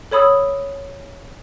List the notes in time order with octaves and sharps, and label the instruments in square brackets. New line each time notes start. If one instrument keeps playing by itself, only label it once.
[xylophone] A4 C#5 B5 D#6 E6